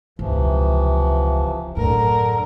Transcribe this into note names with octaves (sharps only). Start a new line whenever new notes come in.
E1 C#2 C3 E3 F3
F#2 A2 D3 A#4